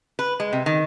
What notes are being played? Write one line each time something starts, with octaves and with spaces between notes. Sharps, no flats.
B4
G#3
C3
D#3